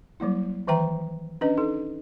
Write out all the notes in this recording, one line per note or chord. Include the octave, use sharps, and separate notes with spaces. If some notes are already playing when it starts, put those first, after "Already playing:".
F#3 G3 A#3 E4
D#3 E3 B4 E5 G5 A#5
C#4 D4 B4 D#5
D#4 A4